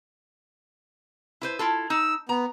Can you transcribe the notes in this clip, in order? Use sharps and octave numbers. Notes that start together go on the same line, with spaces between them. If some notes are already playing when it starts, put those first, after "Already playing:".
E4 B4 C5
E4 F4 A4
D#4 E6
B3 A#5